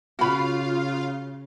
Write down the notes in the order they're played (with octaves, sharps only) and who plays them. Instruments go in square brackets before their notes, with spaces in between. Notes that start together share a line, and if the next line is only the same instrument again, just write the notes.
[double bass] C#3 [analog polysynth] F4 F5 [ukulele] F#4 B5